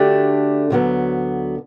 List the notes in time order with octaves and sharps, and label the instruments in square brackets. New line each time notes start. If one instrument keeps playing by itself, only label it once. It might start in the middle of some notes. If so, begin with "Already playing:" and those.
Already playing: [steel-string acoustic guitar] D3 A3 D4 F#4 [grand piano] G4
[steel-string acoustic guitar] D2 D3 F#3 B3